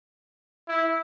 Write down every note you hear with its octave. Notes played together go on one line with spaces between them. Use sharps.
E4